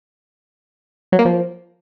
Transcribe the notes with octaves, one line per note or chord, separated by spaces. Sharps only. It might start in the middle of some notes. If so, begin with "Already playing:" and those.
F#3
A#3
F3